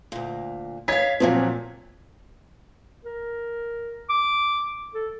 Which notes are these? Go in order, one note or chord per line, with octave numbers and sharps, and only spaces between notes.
D2 A#2
C#5 D#5 F5 G#6 B6
A#2 F3 F#3 A#3 C4
A#4
D6
A4